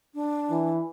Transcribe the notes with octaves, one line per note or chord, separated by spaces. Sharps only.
D4
E3